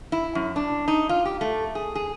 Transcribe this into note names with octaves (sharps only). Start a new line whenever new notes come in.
E4
F#2
D4
D#4
F4
G4
A3
G#4
G#4